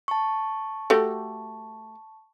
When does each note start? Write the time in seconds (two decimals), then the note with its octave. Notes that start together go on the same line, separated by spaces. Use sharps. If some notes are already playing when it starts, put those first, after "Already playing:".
0.08 A5 C#6
0.90 A3 F#4 G4